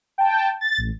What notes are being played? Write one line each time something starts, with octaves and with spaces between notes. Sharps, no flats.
G5 A5
A6
A1